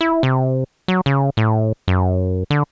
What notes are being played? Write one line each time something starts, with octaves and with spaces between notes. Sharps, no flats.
E4
C3
F#3
C#3
A2
F#2
D3